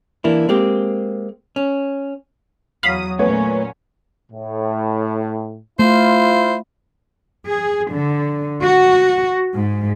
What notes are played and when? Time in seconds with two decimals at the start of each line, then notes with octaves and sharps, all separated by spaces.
0.24 E3 A#3 D4 E4
0.49 G#3 A#3 C4 G4
1.56 C#4
2.83 E2 F#3 F5 B5 D#6
3.19 A#2 F#3 A3 B3 C#4 C#5
4.32 A2
5.79 A3 E4 F4 C5
7.46 G#4
7.92 D3
8.61 F#4
9.55 G#2